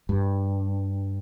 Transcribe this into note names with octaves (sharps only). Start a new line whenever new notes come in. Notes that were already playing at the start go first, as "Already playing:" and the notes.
G2